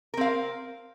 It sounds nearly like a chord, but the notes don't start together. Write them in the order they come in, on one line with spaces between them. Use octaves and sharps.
A#4 C4 F5